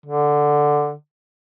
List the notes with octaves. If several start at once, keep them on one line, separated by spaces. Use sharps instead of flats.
D3